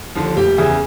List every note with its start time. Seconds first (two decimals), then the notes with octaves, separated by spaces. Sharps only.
0.15 D#2 D3 F3
0.37 F1 G4
0.58 E2 C#3 E3